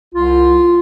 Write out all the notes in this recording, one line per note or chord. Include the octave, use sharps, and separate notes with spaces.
C2 F4